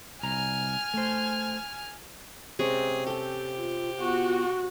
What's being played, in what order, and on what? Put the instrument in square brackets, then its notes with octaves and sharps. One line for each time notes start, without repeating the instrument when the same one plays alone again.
[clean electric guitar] C2 A#5 [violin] G#5 F6
[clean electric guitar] A3 C5
[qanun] C3 G#3 C#4 [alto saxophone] G#4
[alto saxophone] G4 [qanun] A4 G5
[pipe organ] F4
[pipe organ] B3 F4 [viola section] F#4